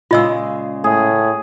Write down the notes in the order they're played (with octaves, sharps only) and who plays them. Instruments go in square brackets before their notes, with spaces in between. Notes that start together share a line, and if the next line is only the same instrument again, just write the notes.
[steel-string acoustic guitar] A#2 C#3 G#3 [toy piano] F4 D#5 E6
[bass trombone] A2 [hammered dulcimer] G#4